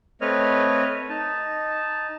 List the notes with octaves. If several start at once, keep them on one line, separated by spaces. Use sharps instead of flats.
A3 C4 B4 C#5 D#5 F6
D#4 A5